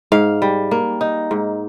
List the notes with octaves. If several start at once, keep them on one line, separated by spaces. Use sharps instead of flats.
G#2 F5
G3
A#3
D#4
G#2